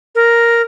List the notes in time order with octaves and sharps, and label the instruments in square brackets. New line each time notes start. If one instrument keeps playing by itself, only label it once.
[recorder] A#4